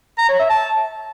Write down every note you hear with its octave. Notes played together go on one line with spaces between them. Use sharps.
A#5
C#5
E5
A5